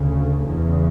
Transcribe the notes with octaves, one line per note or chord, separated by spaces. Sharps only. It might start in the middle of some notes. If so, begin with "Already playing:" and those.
Already playing: D2 C#3
E2 C#3